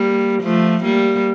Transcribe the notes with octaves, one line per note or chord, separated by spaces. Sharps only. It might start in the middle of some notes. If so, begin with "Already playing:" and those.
Already playing: G3 A#3
F3 A3
G3 A#3